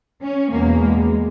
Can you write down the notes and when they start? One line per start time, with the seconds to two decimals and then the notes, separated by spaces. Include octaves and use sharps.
0.22 C#4
0.51 E2 B2 G#3 A#3
0.82 G#3